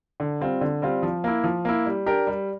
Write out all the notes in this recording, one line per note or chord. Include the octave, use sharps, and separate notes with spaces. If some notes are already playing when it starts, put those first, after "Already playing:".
D3
G3 C4 F4
D3
G3 C4 F4
F3
A#3 E4
F3
A#3 E4
G3
D4 G4 A#4
G3